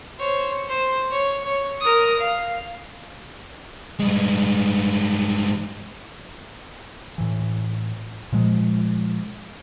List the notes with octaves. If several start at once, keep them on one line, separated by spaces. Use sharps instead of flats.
C5 C#5
C5
C#5
C#5
A#4 D#6
F5
G2 G#3
A2 E3
A#2 F3 G#3